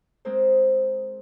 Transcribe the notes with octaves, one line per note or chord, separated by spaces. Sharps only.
G#3 C4 G#4 A#4 C5